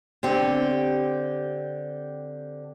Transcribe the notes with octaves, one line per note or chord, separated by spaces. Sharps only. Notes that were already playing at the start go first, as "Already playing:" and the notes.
D3 C4 G4